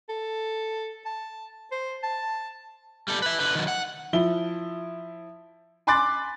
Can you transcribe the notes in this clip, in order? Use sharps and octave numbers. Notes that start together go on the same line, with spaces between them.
A4
A5
C5
A5
G3 A4
B4 E5
D3 B4
D#3 F#3
F#5
F3 E4 G7
G#5 B5 C6 D6 F#6 A6